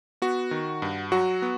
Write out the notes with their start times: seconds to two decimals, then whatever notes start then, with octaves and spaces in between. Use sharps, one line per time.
0.22 B3 F#4
0.51 D#3
0.82 G2
1.12 F#3 F#4
1.42 B3